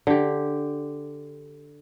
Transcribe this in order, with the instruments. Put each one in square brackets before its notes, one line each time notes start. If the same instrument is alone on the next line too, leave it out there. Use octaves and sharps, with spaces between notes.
[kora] D3 G4